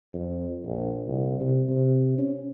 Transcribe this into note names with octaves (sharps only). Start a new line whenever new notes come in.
F2
A#1
C2
C3
C3
C#4